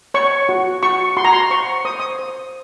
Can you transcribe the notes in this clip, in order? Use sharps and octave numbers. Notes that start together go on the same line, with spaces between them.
C#5 C#6
F#4
F#4 C#6
F#4 C6
A#5
C6
C5 C#6
C5 D#6
D#6
C5